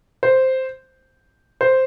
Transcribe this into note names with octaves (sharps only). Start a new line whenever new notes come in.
C5
C5